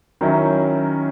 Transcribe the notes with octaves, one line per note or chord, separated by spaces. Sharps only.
D#3 F#3 C#4 E4